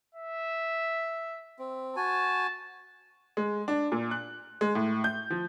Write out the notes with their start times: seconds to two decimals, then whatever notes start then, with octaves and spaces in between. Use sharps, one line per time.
0.15 E5
1.59 C4
1.96 F#4 G#5 A5
3.37 G#3
3.68 D4
3.92 A#2
4.11 F#6
4.61 G#3
4.75 A2
5.04 G6
5.30 F3